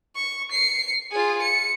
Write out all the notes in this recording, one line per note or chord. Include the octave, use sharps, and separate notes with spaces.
C#6
C7 C#7
F4 G#4
C#7